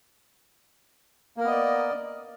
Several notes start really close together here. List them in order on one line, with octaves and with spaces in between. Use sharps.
A#3 A#4 B3 D#5 D5